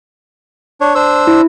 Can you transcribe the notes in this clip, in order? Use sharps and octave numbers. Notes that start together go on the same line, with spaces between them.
D4 C#5
D4 C5 E6
E4